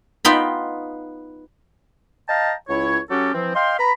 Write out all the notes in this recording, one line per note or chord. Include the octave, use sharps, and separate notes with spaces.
B3 D#4 F4 G5 B5
D#5 F5 G5 A5 A#5
C#2 E4 C#5
F#3 C#4 F#4 G4 A4
E3 F3 C4
D#5 F5 G5 C6
B4 A#5 B5